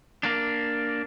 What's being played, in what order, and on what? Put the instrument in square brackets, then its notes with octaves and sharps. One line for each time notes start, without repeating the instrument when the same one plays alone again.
[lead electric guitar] A#3 D4